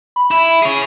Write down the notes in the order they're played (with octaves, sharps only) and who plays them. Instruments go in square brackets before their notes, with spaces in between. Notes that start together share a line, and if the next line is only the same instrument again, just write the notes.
[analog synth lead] B5
[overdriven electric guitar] E4
G#4 C#5